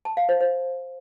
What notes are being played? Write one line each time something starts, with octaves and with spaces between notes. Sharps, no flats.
A5
F5
C5
C5